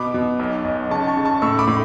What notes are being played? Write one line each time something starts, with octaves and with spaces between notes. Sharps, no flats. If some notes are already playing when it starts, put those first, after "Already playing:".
Already playing: B2 B5 D6
B2
B1
B1
C#3 A5 C#6
A5 C#6
C#3
A5 C#6
A2 C#6 E6
B5 D6
A2